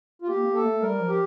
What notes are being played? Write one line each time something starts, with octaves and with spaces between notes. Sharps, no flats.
F4
A#3 G4
A#3
A4
A3
G3 A#4
F3
G4